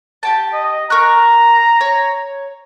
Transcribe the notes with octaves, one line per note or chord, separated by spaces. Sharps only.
G4 G5 A5
D#5
A#4 A#5 C#6 F#6
C#5